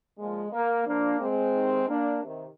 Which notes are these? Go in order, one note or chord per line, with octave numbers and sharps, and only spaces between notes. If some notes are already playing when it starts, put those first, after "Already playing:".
A#2 F3 G#3
A#3
A#2 F3 A#3 D4
G#3 C4
C3 D#3
A#3 D4
C3 D#3